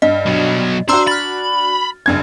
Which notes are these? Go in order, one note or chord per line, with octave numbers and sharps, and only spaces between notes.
G2 D#5
B2 F#3
D4 F#4 C5 A#5 C6 E6
B5 F6 A6
F#1 G2 G#6